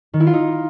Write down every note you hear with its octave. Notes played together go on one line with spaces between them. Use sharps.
D#3
E4
F4
D#4